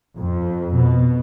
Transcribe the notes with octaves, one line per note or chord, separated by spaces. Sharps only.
F2
B2